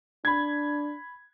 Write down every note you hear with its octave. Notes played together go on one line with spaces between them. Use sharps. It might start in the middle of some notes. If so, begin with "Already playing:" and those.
D4 B5 G#6